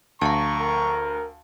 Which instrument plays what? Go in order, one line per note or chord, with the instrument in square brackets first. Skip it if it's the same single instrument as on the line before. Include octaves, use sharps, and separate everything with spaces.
[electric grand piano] D2 [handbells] F5 A5 [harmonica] A#5 C#6
[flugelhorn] A#4